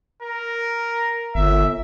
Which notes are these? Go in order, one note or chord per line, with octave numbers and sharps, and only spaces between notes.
A#4
G1 E5